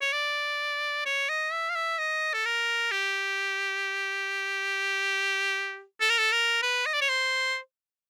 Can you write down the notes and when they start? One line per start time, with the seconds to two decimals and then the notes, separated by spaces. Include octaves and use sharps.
0.02 C#5
0.13 D5
1.05 C#5
1.29 D#5
1.52 E5
1.70 F5
1.75 E5
1.99 D#5
2.34 A4
2.45 A#4
2.91 G4
6.01 A4
6.10 A#4
6.18 A4
6.32 A#4
6.63 B4
6.86 D#5
6.94 D5
7.01 C#5
7.09 C5